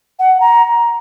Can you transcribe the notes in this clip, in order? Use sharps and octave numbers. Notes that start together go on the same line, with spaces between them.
F#5
A#5